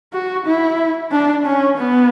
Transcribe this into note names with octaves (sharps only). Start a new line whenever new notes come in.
F#4
E4
D4
C#4
B3